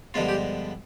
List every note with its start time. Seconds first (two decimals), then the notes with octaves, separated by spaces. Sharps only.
0.14 G2 D3 F3 G#3 B3 F4
0.29 G4